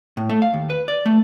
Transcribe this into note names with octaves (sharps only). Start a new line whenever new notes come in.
A2
A3
F5
D#2
B4
D5
A3